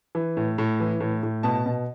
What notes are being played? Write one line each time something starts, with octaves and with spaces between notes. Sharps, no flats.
E3
A2
A2
E3
A2
A2
B2 A5
B2